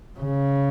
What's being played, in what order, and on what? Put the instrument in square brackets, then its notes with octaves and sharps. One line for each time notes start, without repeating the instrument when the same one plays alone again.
[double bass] C#3